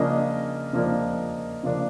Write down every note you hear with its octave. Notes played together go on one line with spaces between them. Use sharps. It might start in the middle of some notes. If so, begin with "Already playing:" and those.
Already playing: C#3 F3 A#3 D4 D#5
C#3 F3 A#3 D4
C#3 F3 A#3 D4